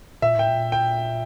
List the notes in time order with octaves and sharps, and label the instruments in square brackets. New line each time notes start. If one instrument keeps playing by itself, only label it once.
[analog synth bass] A#2 [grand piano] E5
[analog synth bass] A2 [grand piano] G5
[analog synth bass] A#2
[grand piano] G5